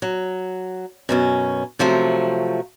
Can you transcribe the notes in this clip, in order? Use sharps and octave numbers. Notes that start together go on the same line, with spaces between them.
F#3
F#2 B2 C#4
C3 F3 F#3 A3